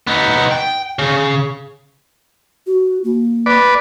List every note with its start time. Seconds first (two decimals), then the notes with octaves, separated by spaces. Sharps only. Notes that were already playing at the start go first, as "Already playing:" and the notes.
0.07 B3 D#4
0.51 G5
0.99 C#3
2.66 F#4
3.04 A#3
3.46 B4 D5